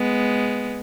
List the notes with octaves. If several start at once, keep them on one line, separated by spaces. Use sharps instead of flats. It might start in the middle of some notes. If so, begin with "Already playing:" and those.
Already playing: G#3 B3